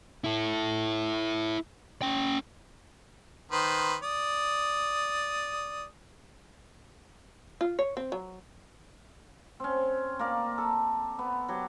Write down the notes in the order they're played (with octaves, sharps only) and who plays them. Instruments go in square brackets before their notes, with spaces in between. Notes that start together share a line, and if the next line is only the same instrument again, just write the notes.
[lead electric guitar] E4 A4
C#4 G5
[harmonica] D#3 B4 C5
D5 D#6
[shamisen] F4
C#5
C4
F#3
[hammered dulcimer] C4 C#4
A#3 A#4 D5
A4
B3
F#3 G4